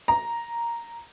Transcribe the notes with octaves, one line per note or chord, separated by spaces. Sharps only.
A#5